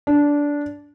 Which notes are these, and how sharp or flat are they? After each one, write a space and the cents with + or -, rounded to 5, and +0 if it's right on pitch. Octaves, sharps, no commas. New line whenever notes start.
D4 -15